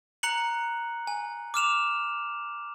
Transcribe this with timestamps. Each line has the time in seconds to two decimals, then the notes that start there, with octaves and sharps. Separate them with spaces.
0.23 A#5 F#6 C#7 F#7
1.07 G#5
1.54 D6 F6 E7 F7